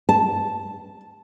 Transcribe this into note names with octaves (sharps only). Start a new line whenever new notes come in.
A5